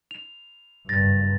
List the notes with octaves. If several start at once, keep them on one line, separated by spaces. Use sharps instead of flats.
F7
F#1 G2 A6 A#6